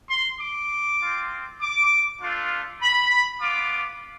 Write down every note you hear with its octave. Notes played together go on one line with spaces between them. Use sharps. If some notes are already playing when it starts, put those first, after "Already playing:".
C6
D6
C4 F4
D6
A3 D4 F4
B5
B3 F4 D6